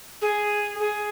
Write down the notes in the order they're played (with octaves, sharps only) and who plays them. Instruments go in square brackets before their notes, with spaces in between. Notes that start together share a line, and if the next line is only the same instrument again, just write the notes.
[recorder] G#4
G#4